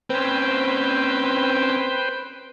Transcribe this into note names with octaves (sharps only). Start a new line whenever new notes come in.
C4 C#4 B4 C5 G5